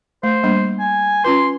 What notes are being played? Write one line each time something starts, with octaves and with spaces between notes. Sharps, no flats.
A3 C5
G3 A#3 D4
G#5
C#4 F4 B4 C6